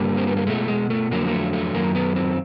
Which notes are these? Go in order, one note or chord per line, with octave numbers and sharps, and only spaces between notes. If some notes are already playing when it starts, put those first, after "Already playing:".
Already playing: G2 D3 G3 A#3
C4
B3
A#3
B2 G#3 A3
G#3
A3
F2 D3 F#3 A#3
A#3
A3
A3
F#2 D#3 F#3 A#3
B3
C4